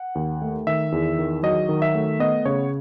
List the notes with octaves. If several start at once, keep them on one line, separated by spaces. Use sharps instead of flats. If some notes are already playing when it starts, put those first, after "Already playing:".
Already playing: F#5
D#2
A3
D#3 E5
E2
D#3
F#3 D#5
D#3
E5
A3
B3 D#5
C#3 C#5